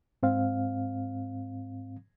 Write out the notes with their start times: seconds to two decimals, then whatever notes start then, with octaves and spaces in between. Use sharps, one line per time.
0.23 G#2 C4 F5